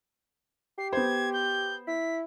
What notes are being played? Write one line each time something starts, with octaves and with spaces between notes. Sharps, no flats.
G4 C7
B3 C5 G#6
G6
E4 B6